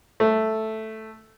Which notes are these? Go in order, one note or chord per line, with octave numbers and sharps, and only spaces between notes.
A3